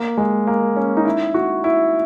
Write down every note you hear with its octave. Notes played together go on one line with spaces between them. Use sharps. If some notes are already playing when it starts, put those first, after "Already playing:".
Already playing: A#3
G#3
A#3
C#4
D#4
E4
F#4
E4